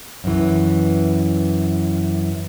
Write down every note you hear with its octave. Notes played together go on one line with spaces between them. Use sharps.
F#2 E3